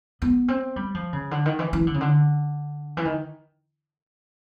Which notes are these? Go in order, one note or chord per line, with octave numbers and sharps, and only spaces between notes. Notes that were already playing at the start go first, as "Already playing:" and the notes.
B3
C4
G3
F3
C#3
D3
D#3
E3
E3
D3
C#3
D3
E3
D#3